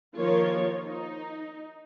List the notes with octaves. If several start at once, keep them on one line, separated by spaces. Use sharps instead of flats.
D#3 F3 A#3 F4 A#4 C#5
D#4